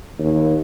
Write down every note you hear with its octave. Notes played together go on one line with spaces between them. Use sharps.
D#2